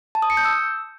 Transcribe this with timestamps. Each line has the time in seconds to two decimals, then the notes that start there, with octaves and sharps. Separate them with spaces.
0.15 A5
0.22 D#6
0.30 C#7
0.37 G6
0.45 E6